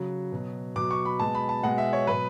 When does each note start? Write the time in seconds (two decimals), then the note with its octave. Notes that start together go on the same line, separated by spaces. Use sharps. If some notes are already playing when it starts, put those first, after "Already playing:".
Already playing: C#3 F#3
0.32 B2 F#3
0.76 B2 F#3 D6
0.91 C#6
1.05 B5
1.19 B2 G#3 A5
1.35 B5
1.49 A5
1.63 B2 G#3 F#5
1.78 E5
1.93 C#5
2.07 B2 F#3 B4